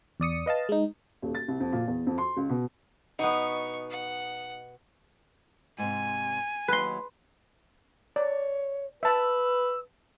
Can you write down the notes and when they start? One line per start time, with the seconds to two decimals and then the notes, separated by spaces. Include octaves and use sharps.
0.20 E2 D5 D#6 C#7
0.46 B4 D#5 F5 A5
0.69 G#3 D#4
1.22 D#1
1.35 A6
1.48 C2
1.60 F2
1.73 A#2
1.88 E2
2.07 F2
2.18 C6
2.37 C#2
2.50 B2
3.19 B2 B3 D#4 C#6
3.90 F#5
5.78 G#2 C3 G#5
6.68 D#2 F#3 B4 C6
8.16 C#5 D5
9.03 B4 E5 A5 E6